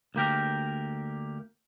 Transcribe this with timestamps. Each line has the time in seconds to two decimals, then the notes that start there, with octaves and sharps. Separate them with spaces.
0.15 D2 A#3 G4 A#4